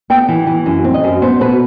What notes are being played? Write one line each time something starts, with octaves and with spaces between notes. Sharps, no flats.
B3 G5
E3
E3
F#2
C4
D#5
F#2
B3 C5
B2 B4